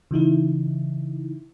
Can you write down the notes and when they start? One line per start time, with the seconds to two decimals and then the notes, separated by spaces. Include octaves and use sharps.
0.11 C#3 E3 D#4 E4